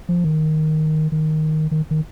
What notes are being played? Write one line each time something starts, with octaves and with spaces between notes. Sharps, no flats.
F3
D#3
D#3
D#3
D#3